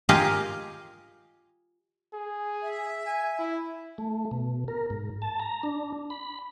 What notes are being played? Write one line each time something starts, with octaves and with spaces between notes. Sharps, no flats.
F4 G4 G#4 A#4 D#5 F5
G#4
E5
G#5
E4
A3
B2
A#4
G#2
A5
A#5
D4
B5